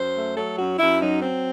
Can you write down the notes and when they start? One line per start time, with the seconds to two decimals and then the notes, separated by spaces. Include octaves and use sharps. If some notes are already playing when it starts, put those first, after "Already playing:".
Already playing: F#2 C5
0.14 A3
0.35 F#3 A4
0.57 F#2 F#4
0.79 F#2 E4
1.00 F#3 D#4
1.22 F#3 C4